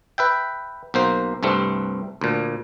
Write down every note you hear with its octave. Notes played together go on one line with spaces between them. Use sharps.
B4 E5 G5
B1 A#3 C5
C2 G2 A3 C4
D2 A#2